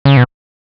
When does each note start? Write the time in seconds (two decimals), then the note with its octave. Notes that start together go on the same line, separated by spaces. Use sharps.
0.05 C#3
0.17 B2